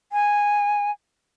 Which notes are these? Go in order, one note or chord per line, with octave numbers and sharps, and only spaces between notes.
G#5